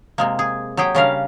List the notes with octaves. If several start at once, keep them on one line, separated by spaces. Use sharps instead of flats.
C3 G#3 A#3
G#4
F#3 G4 G#4 G5
C#3 G3 C#4 D4 A#4 F5